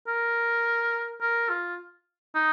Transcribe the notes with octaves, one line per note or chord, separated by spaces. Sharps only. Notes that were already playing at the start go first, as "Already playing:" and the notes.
A#4
A#4
F4
D#4